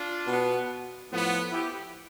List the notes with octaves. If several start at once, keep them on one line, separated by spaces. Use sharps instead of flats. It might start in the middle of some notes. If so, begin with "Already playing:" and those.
Already playing: D4 F4
B2 B3
A2 F3 B3
E4 G4